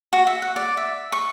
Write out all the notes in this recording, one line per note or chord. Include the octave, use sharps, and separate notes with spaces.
F#4
E5
F#5
D5
E5
C#6